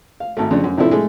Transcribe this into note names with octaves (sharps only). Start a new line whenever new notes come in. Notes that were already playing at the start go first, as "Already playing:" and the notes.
F5
G#1 A3
F2 C#3 D4
F#2
A2 C3 F3 D4 E4 A4
G#3 A3